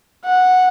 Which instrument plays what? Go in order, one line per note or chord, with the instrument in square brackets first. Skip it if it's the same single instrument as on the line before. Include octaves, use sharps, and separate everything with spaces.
[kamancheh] F#5